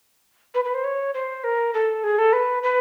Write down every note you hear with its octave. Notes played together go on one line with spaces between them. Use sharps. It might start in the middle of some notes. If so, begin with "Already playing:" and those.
B4
B4
C5
C#5
C5
A#4
A4
G#4
A4
B4
B4